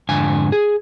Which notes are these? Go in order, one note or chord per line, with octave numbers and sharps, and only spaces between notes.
F2 G#2 D3 G#5
G#4